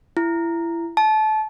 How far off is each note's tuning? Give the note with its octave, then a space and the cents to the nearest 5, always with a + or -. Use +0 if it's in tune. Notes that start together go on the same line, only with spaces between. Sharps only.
E4 +25
A5 -25